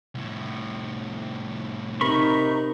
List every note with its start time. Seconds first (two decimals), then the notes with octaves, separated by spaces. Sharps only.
0.15 C2 A2
2.01 C3 D#4 A#4 B5 C#6